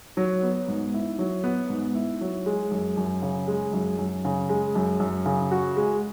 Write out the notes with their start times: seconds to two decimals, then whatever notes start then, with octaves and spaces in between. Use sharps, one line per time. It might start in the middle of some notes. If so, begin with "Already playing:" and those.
0.17 F#3
0.43 B3
0.68 G#2
0.94 E4
1.19 F#3
1.44 B3
1.70 G#2
1.95 E4
2.21 F#3
2.46 G#3
2.71 F#2
2.97 F#2
3.22 C#3
3.48 G#3
3.73 F#2
3.98 F#2
4.25 C#3
4.49 G#3
4.75 F#2
5.00 F#2
5.26 C#3
5.51 F#4
5.77 G#3